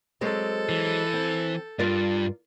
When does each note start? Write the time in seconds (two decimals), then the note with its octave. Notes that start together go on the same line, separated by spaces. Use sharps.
0.21 F#3 G#3 C4 A4
0.69 E3
1.13 C4
1.79 G2 F4 A#4 D5